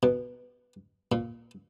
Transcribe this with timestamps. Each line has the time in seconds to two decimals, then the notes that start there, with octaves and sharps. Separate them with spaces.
0.03 B2
1.12 A#2